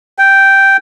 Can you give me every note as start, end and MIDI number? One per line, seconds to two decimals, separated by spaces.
0.18 0.77 79